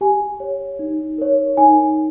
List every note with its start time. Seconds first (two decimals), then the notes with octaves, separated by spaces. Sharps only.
0.01 G4 G#5
0.40 C#5
0.79 D#4
1.18 A#4 C#5
1.57 D#4 G#5